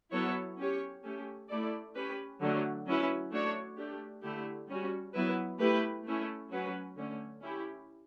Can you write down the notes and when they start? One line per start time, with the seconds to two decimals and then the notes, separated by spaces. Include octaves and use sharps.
0.12 F#3 B3 E4 A4 C#5
0.59 C#4 G4 C#5
1.05 A3 C#4 G4
1.50 A3 E4 A4 D5
1.95 C#4 G4 B4
2.42 D3 F#3 A3
2.87 F#3 C#4 E4 B4
3.32 A3 D4 F#4 C#5
3.78 A3 D4 G4
4.23 D3 A3 E4 G4
4.69 G3 C#4 F#4
5.14 F#3 B3 E4 B4
5.60 A3 E4 G4 B4
6.06 A3 C#4 E4
6.51 F#3 C#4 F#4 B4
6.97 D3 A3 C#4
7.43 C#4 E4 G4